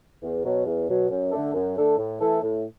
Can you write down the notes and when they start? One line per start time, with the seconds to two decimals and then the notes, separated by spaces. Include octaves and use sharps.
0.22 E2
0.43 B2 F#3
0.66 E2
0.88 B2 F#3
1.10 F#2
1.31 D3 A3 D4 A4
1.53 F#2
1.76 D3 A3 D4 A4
1.97 A2
2.20 E3 A3 E4 A4
2.42 A2